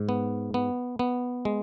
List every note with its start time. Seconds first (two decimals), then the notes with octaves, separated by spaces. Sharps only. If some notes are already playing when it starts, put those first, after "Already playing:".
Already playing: G#2
0.09 B3
0.54 B3
0.99 B3
1.45 G#3